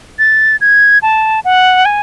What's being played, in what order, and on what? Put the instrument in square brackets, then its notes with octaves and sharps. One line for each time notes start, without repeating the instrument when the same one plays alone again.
[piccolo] A6
G#6
A5
F#5
G#5